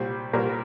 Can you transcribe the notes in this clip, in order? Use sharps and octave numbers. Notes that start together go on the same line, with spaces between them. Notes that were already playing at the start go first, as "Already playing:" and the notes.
Already playing: C2 A#2 G3 C5
C2 A#2 G3 A#4